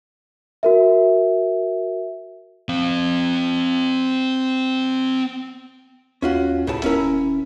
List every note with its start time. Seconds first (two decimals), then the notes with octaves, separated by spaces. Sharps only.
0.63 F#4 A#4 E5
2.69 C4 F5
6.22 D#2 C#4 F4 F#4
6.67 D2 A2 C#3 A5
6.84 D#1 C#4 E4 A#4